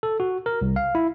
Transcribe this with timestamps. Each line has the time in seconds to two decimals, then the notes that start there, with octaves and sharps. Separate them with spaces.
0.03 A4
0.20 F#4
0.46 A#4
0.62 C2
0.76 F5
0.95 E4